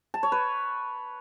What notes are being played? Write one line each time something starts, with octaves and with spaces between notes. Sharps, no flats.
A5
C#5
B4